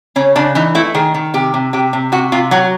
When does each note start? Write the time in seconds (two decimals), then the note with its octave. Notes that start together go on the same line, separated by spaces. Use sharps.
0.16 C#3 C#4
0.35 C#3 D4
0.55 E3 D#4
0.75 A3 E4
0.95 D#3 G#4
1.14 D#3
1.34 C3 G4
1.54 C3
1.73 C3 G4
1.93 C3
2.12 C3 F#4
2.32 C3 F4
2.51 F#3 F#4